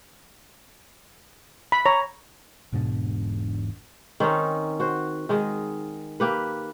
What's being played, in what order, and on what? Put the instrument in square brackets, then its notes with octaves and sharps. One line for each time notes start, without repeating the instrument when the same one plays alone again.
[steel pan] B5
[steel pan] C#5 [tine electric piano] A#5
[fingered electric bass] E1 G#2 B2 D3
[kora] D#3 C4 C#4 D#4
F#4 C5
D#3 G#3 D#5
A#3 G4 B4